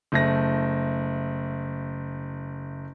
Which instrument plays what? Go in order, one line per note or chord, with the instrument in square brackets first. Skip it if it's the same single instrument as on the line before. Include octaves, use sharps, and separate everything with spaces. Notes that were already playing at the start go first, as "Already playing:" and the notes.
[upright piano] F#1 A3 A#6